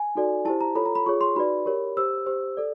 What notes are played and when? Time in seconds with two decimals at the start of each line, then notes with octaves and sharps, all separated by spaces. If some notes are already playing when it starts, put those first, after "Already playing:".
Already playing: G#5
0.15 D#4 F#4 A4 D5
0.45 E4 G4 C5 A5
0.61 A#5
0.75 F4 A4 C#5 B5
0.86 A#5
0.95 B5
1.06 F4 G#4 C#5 C#6
1.21 C6
1.36 D#4 F#4 B4 D5 B5
1.66 G4 A#4 C#5
1.97 G4 C5 E6
2.26 G4 C5
2.57 A4 D5